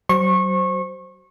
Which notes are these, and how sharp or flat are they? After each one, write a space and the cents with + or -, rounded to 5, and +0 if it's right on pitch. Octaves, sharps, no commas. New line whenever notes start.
F#3 +35 C5 +0 C#6 -25